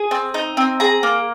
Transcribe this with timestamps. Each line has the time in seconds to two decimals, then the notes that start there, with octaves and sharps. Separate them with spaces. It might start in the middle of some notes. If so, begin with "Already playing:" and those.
Already playing: G#4
0.11 C4
0.34 D#4
0.57 C4
0.80 G#4 A#5
1.03 A#3